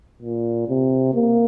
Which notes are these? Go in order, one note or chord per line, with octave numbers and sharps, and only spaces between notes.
A#2
C3
A#3